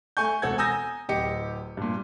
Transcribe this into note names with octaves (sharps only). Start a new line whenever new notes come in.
A3 G#5 C#6 G6
E1 A4 F#5 G#6
G#5 A#5 D#6 E6 G6 A#6
D1 G4 D#5 C#7
G2 A#2